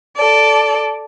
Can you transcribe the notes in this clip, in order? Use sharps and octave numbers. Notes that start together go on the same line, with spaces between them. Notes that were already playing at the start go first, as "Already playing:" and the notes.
A4 D5